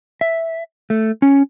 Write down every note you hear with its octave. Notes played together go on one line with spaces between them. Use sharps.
E5
A3
C#4